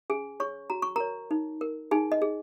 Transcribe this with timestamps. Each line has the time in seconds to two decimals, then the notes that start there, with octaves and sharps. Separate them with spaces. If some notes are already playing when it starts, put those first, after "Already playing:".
0.10 C#4 G#4 G#5
0.40 G#4 C#5 C#6
0.70 F#4 A#5
0.82 C#6
0.96 A#4 C#5 A#5
1.31 D#4
1.61 A#4
1.91 D#4 G#4 G#5
2.12 D#5
2.22 G#4